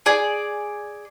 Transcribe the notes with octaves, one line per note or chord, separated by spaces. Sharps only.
G#4 D5